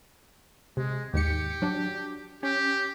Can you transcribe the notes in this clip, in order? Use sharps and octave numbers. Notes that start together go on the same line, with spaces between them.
C3 G#3
D#2 G#2 G4 C#7
F#3 D4
C#4 G4